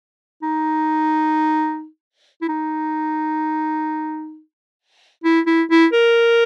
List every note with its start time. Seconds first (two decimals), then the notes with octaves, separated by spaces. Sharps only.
0.42 D#4
2.41 E4
2.48 D#4
5.24 E4
5.46 E4
5.70 E4
5.93 A#4